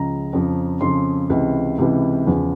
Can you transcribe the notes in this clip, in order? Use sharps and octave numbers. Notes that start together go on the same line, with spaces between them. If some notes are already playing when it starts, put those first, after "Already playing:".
Already playing: C#2 C#3 F3 A#5
F2 C#3 F3
F2 C#3 F3 C6
C#2 C3 E3
C#2 C3 E3
E2 C#3 F3